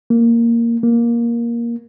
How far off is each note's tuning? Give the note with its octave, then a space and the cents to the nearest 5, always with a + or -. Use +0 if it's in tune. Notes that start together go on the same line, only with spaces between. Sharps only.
A#3 -5
A#3 +10